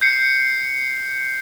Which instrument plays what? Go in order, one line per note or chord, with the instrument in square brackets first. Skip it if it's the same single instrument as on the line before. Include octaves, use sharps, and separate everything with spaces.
[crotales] G6 C7 C#7